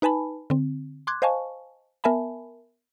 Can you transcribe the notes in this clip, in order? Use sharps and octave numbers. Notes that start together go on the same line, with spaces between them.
D#4 B4 G#5 A5 B5
D3 C4
C6 D6 F#6 G#6
C5 D#5 F5 G#5 A5 C#6
B3 A#4 E5 G#5 A5 B5